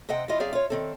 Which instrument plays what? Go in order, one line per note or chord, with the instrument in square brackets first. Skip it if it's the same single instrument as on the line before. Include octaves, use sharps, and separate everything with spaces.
[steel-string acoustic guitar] C3 C4 D#5 F#5 G5
E2 E4 F4 D#5
F#3 C4 G#4 D5 E5 F5
F4 C#5
D#3 C4 A4